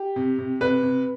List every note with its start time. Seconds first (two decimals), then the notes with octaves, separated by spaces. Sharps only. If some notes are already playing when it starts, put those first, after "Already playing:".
Already playing: G4
0.16 C3
0.39 C3
0.61 C3 B4
0.83 C3